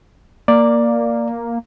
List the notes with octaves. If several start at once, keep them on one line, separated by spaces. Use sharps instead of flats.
A#3 D5